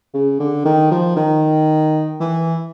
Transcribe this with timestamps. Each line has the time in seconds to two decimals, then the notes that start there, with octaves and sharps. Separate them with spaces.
0.14 C#3
0.40 D3
0.65 D#3
0.91 F3
1.16 D#3
2.20 E3